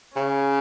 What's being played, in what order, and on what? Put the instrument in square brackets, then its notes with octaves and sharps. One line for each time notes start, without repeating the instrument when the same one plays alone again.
[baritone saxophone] C#3 [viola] C#4